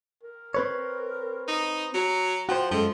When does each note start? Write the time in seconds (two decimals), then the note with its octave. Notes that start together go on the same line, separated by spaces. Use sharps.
0.23 A#4
0.54 C4 B4 C#5
1.48 D#4
1.94 F#3
2.49 F3 F#4 C5 G5
2.71 F#2 F3 G#3 A4